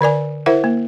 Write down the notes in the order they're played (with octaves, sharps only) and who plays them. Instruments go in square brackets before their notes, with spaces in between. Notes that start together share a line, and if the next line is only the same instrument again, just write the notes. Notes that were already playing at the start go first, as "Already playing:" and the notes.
[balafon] D3 A#4 D5 G#5
E4 A#4 C5 E5 F#5
A#3